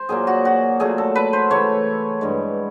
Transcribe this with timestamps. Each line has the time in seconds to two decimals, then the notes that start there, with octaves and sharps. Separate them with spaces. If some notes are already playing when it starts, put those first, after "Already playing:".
Already playing: C5
0.09 A#2 F#3 A#3 G#4
0.27 F#4
0.45 F#4
0.80 A#2 F#3 A3 G#4
0.98 A4
1.15 B4
1.33 C5
1.50 C#3 E3 A3 C#5
2.21 G2 E3 G#3